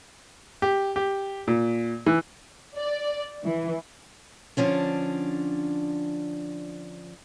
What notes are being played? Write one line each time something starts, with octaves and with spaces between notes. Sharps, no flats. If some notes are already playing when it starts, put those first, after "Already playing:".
G4
G4
A#2
E3
D5
E3
D3 F3 C#4 D4